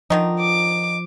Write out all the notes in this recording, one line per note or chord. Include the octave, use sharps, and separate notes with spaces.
D3 D#3 F3 D#4
D6